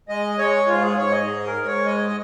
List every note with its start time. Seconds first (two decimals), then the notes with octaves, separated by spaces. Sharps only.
0.09 G#3 D#5
0.38 G#3 C#5
0.68 G#2 F4
0.83 G#4
0.97 G#2 C#5
1.11 D#5
1.26 G#2 G#4
1.47 A#4
1.56 G#2
1.66 C#5
1.85 G#3 D#5